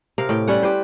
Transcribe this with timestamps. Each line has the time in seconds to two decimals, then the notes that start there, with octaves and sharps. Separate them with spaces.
0.18 C3 A#4 F5
0.29 A2 G5
0.47 G3 C#4 E4 F#5
0.63 G4 B4 C5